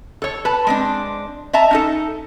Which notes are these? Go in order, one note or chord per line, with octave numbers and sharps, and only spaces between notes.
A4 C#5
B4 A5
G#3 C4 D4
D#5 E5 A5 A#5
C#4 D#4 A4